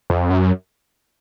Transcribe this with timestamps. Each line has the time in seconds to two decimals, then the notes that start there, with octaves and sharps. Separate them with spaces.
0.10 F2
0.30 F#2